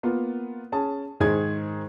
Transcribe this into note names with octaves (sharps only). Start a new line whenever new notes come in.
A#3 B3 F4
C#4 G#4 A5
G#2 D#3 G#4 C5 G#6